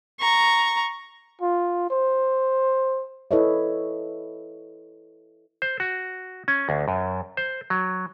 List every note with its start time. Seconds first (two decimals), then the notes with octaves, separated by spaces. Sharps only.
0.20 A#5 C#6
1.42 F4
1.90 C5
3.31 E4 A4 B4 C#5 D#5 E5
5.62 C5
5.80 F#4
6.48 C#4
6.69 D2
6.88 F#2
7.37 C5
7.70 F#3